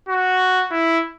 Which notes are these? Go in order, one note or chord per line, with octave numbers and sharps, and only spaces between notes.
F#4
E4